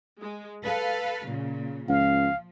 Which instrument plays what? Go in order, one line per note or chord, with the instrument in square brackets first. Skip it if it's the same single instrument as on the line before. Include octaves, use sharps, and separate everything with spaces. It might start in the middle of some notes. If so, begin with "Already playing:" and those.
[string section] G#3
A4 B4 F5
A#2 C#3
[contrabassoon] C#2 [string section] F3 [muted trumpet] F5